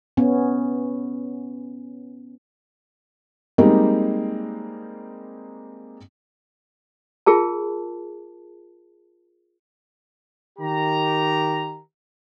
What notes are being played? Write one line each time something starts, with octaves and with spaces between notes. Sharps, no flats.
B3 C#4
G3 G#3 A#3 C4 D#4 G4
F4 G#4 A#4 A5
D#3 G4 A#5